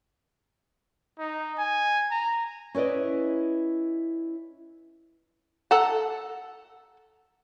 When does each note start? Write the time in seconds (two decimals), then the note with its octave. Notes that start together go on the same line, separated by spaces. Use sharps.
1.19 D#4
1.58 G#5
2.11 A#5
2.75 C#4 E4 B4 D5 D#5
5.71 A4 F#5 A5 A#5